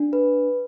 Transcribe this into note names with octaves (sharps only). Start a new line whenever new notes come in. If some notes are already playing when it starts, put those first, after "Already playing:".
Already playing: D4
B4